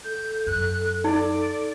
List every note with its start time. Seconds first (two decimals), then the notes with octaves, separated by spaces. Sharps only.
0.04 A4 G6
0.47 F#2 F#6
1.04 D#4 D5